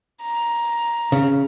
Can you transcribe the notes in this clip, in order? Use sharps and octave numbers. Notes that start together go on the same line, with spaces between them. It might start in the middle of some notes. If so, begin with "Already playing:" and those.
A#5
C#3